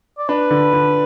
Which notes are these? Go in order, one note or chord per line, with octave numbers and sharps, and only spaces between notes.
D5
D4 B4
D3
D3